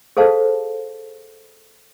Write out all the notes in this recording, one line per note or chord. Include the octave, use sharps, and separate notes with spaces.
G#4 A4 C5 F5 A5